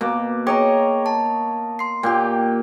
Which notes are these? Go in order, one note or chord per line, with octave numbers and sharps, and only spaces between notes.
B2 A#3 D6
G#4 C#5 D#5 G5 A#5 D6
A5
C6 C7
A#2 G4 G5 G6